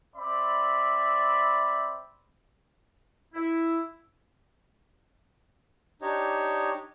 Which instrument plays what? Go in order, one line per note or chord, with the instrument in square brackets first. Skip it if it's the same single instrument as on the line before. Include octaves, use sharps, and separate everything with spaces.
[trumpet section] C4 D5 E5 B5
[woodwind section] E4
[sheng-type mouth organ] D4 D#4 G4 C#5 D#5